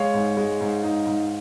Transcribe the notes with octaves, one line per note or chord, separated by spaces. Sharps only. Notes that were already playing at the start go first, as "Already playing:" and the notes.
Already playing: G#3 C#5 F5
G#2
G#3
G#2
D#4
G#2